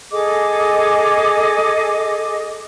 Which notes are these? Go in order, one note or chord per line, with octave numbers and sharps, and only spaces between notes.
G#4 A4 D#5 D6